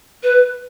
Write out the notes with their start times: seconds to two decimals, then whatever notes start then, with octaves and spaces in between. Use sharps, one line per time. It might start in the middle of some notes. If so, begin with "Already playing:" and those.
0.23 B4